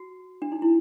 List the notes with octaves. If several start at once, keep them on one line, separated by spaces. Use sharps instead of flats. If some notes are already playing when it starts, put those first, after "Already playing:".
Already playing: F#4
D4
D#4
E4